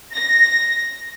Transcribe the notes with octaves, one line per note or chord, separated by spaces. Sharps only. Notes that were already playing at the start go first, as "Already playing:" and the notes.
A#6